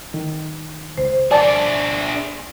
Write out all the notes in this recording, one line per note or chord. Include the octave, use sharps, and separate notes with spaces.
D#3
C#2 C5
D4 G#4 D5 A5